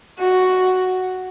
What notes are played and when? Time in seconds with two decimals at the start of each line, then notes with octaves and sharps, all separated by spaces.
0.19 F#4